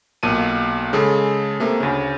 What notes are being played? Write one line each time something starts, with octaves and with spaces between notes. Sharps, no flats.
B1 A#2 A5 D#7
C#3 G#3 G#4 A4
C3 A3 A#3
D2 C#3